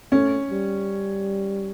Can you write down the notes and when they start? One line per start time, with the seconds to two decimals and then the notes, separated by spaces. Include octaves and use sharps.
0.12 A3 C#4
0.51 G3